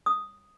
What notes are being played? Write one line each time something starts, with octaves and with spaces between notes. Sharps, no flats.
D#6